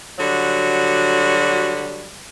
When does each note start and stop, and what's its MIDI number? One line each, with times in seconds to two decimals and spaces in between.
0.19 2.11 50
0.19 2.11 54
0.19 2.11 55
0.19 2.11 66